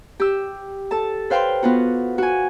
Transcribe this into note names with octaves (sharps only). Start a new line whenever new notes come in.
G4 E6
A4 A5
B4 C5 F5 G5 C6
B3 F4 F#4
F#4 G#5